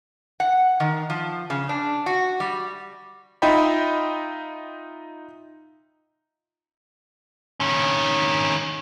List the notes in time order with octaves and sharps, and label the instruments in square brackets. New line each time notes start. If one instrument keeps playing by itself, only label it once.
[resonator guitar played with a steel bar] F#5
D#3
F3
C#3
D4
F#4
G3
[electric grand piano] D#4 F4 D#5 E5 G5 B5
[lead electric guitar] D#3 C#4